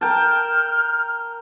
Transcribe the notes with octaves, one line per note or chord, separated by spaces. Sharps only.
A#4 G5 A5 F6